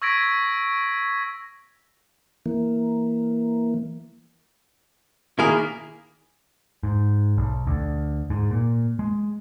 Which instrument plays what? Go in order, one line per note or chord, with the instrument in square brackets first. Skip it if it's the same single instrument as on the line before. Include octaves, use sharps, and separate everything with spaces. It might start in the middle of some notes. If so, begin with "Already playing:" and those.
[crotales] C#6 E6 G#6 A#6 B6 D7
[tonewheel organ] E3 A#3
[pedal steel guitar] D#3 A#3 A#4 [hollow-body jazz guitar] E4 G#4
[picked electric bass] G#2
B1
D2
G#2
A#2
G#3